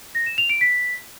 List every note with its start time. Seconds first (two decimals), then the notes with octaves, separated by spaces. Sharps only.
0.15 A#6
0.26 E7
0.38 F7
0.50 D7
0.61 B6